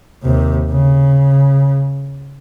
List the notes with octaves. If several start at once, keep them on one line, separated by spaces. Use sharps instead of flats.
D#2 C3
C#3